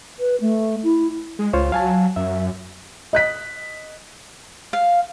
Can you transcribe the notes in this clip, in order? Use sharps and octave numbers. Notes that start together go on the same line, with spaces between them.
B4
A3
E4
G#3
C#2 F4 C5 C#5
F#3 F5 G#5 A5
F#2 E5
D#5 F#6 B6
F5